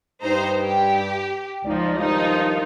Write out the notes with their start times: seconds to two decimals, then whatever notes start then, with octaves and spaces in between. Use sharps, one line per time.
0.23 G2 D#4 C5 A#5
0.61 G4
1.66 C#2 F3 D#4 D5
1.98 G2 D#3 F3 D#4 F4